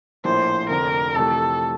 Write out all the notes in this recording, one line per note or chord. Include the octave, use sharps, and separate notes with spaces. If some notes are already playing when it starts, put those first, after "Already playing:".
A#1 A2 F3 A#3 E4 C5
F1 F2 D3 A#4
F2 C3 E3 A3 A4